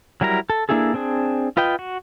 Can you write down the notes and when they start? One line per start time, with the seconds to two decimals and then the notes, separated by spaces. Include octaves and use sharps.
0.21 F#3 G3 E4 A#4 A#5
0.50 A4
0.69 A#3 D4 E4 G#4 A4
0.94 C4 D4 G#4
1.57 F4 B4 D#5 G5
1.79 F#4